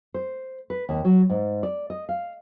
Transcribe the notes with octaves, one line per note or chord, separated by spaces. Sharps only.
C5
B4
D#2
F#3
G#2
D5
D#5
F5